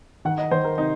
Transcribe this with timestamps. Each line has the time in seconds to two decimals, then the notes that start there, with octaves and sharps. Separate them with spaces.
0.25 D#3 F#5
0.38 D#5
0.51 D#3 C5
0.64 A#4
0.78 C3 D#4